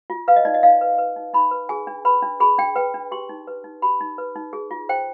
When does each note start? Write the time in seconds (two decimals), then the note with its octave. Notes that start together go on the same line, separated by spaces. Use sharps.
0.10 F4
0.28 B4 F5
0.36 D#5
0.45 D#4 D5
0.54 D#5
0.63 D#4 F5
0.81 B4
0.98 B4
1.16 D#4
1.34 D#4 B5
1.51 B4
1.69 G#4 G#5
1.87 D4
2.05 B4 B5
2.22 D4
2.40 G#4 B5
2.58 D4 G5
2.76 B4 G5
2.94 D4
3.12 G4 C6
3.29 D#4
3.47 B4
3.64 D#4
3.82 G4 B5
4.01 D#4
4.18 B4
4.36 D#4
4.53 G#4
4.71 F4
4.89 C5 G5